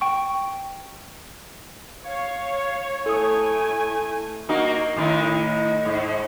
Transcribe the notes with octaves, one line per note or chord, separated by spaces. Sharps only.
G5 C#6
C#5 F5
A3 E4 A4 G#5 D#6
A#3 D#4 F#4
A2 D#3 E4
G#2